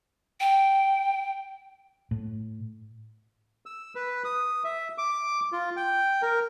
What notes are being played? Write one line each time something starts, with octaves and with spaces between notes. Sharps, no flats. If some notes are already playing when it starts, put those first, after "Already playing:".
G5
A2
E6
B4
D#6
E5
D6
F4
G5
A#4